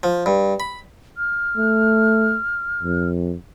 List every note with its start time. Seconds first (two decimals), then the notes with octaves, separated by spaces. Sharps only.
0.03 F3
0.26 G2
0.60 B5
1.17 F6
1.57 A3
2.83 F2